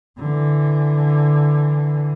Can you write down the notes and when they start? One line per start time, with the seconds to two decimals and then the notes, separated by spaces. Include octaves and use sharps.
0.18 D3 E3